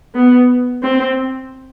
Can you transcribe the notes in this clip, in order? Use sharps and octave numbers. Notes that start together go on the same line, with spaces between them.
B3
C4